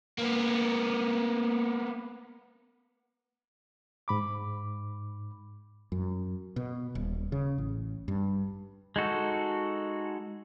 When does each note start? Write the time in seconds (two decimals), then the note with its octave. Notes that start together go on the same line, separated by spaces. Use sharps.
0.18 A#3 B3
4.08 G#2 B5 D6
5.92 F#2
6.56 B2
6.95 D#1
7.32 C#3
7.58 A1
8.08 G2
8.96 G#3 D#4 F#4 A4